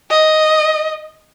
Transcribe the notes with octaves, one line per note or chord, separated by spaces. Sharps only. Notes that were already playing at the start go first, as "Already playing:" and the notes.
D#5